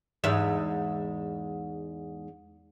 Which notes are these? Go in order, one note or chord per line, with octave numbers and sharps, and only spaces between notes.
E2 G#2 E5